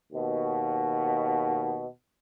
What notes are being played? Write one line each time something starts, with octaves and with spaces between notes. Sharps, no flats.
D#2 B2